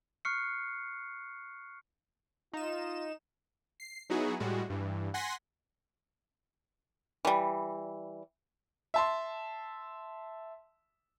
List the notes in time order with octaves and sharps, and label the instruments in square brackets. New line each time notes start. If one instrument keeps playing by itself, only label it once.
[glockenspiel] C#6 F6 F#6 C7 C#7
[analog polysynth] D#4 E7 [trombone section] F4
[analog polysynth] C7
F#3 B3 D#4 E4 F#4 G#4
A2 G3 G#3 F#4
G2 E3
F#5 G#5 C6 A#6 B6
[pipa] E3 G3
[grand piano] E5 A5 C6